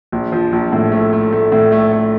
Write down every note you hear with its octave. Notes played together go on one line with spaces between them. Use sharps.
A#1
F3
A#1
A2
A3
A3
A3
A2
A3
A3